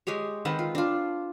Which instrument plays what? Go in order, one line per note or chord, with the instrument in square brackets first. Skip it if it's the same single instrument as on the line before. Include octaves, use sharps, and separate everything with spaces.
[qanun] G#3 G4 G#4 C#5
D#3 C4 B4 F#5
F4
D4 F4